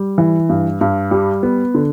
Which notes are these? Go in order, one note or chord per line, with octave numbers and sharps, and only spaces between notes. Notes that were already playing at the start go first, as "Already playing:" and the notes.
Already playing: G3
E3
G2
G2
G3
B3
D3